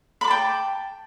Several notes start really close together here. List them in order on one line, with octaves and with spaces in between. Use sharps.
B5 D6 A5 G5